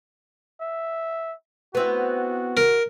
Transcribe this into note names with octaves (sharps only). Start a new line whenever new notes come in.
E5
B3 C4 E4 F#4
A#4